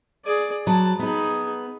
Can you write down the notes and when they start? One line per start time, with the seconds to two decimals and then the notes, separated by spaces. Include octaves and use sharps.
0.25 G#4 D5
0.67 F#3 B4 A5
0.99 B3 D#4 G#4 B4